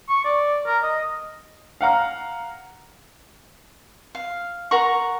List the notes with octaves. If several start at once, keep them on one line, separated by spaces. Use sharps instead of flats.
C#6
D5
A#4
D#5
F5 F#5 A#5 F6
F5
A#4 F#5 A#5 C#6